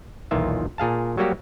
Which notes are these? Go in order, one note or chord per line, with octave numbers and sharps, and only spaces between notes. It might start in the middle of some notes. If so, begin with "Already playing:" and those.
B1 E2 A#2 D#3 F4 E5
A#2 G#4 F5 A5
F#3 G3 A#3 F#4 G4